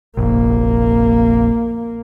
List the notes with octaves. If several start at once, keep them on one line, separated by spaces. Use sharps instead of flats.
F1 A#1 A#3